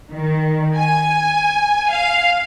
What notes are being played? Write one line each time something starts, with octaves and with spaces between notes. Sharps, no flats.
D#3
G#5
F5